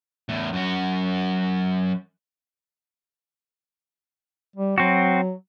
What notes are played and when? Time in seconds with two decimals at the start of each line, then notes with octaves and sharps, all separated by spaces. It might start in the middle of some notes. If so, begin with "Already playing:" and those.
0.29 E2 A2
0.53 F#2 F#4
4.56 G3
4.78 F#3 C4 F#4